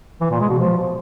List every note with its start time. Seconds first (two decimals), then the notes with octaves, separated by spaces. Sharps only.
0.21 E3
0.30 A#2
0.40 G#3
0.49 B2
0.59 F3